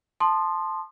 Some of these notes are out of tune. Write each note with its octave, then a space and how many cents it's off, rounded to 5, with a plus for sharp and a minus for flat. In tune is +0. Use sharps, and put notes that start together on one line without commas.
A5 +0 C6 +5 D#6 -35